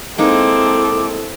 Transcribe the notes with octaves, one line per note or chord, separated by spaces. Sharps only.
G#3 A#3 C4 D#4 E4 A4 D6